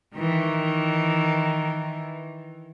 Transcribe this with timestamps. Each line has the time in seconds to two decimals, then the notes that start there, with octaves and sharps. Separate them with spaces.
0.15 D#3 E3